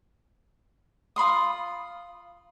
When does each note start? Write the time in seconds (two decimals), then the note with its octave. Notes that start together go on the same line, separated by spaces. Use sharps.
1.16 F4 B5 C6 D#6